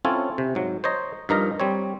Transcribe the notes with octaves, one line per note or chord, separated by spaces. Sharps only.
C4 C#4 E4 F4 A4 C#5
C3
G#2 F#3
C5 C#5 D#5 A#5
G2 F3 D#4 A#4 D#5 A#5
G3 C4 C#5